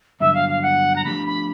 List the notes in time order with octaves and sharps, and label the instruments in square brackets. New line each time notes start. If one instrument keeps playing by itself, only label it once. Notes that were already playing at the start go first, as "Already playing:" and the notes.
[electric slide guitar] G2 D3 F#3 [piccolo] E5
[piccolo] F5
F5
F#5
A#5
[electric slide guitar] F3 A3 D4 G4 [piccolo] B5
[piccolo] B5